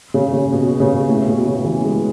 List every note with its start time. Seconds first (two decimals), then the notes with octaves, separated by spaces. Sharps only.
0.14 C#3
0.33 C#3
0.52 B2
0.80 C#3
1.09 A2
1.28 B2
1.45 C#3
1.65 E3
1.84 G#3